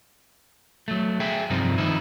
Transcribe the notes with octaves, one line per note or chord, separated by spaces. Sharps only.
F#3 A3
G#4 E5 G5
C2 G2 F3 C4 D#4 F4
D#3 F3 D#4 E4